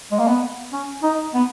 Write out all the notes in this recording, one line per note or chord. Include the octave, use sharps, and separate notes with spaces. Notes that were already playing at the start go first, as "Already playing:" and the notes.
G#3
A#3
B3
C#4
D#4
B3